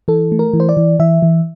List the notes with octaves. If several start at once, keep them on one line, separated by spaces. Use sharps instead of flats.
E3 A4
A3
A#4
E3
C5
D5
E3
E3 E5
E3